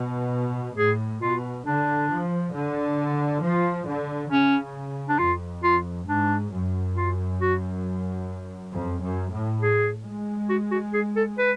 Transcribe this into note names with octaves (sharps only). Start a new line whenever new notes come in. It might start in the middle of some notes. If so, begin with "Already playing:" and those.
Already playing: B2
A2 G#4
B2 F4
D3 D4
F3
D3
F3 F4
D3
C#3 C#4
D4
F2 F4
F4
G#2 D4
F#2
F4
F#4
F2
F#2
A2
G#4
G#3
F#4
F#4
G#4
A4
B4